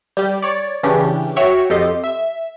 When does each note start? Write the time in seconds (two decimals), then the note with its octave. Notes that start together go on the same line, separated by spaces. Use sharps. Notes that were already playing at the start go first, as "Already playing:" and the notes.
0.17 G3 G4
0.42 C#5 D5
0.83 C#3 E3 C#4 D4 G4
1.36 F#4 C#5 E5 G5
1.70 F2 G4 A4 D#5 C6
2.04 E5